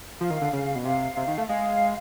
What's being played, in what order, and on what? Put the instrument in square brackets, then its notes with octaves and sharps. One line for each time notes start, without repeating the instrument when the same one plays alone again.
[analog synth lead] F3 [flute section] F5
[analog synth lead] D#3
D3
C#3
B2
[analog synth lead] C3 [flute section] F5
[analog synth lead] C3
D#3
A3
[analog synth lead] G#3 [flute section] F5